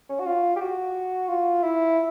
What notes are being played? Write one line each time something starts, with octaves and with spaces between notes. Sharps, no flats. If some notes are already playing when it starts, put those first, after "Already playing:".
C#4
F#4
F4
G4
F#4
F4
E4